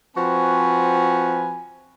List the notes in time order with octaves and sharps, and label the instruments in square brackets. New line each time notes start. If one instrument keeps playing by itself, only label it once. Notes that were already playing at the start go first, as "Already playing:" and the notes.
[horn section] F3 C4 F#4 B4 G#5